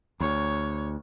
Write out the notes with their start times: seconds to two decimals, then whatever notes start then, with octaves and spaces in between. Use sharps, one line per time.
0.20 D2 C#5